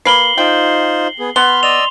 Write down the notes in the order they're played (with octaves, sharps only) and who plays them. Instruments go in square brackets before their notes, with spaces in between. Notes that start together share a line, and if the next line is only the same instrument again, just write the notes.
[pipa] A#3 B4 [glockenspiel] C7 F#7 G7
[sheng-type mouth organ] D#4 F4 C5 [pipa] G5
[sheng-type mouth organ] B3 G#4
[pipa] B3 [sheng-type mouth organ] B5 F6 [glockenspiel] C6 G7
[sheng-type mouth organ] D5 D#5 E6 [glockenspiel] F7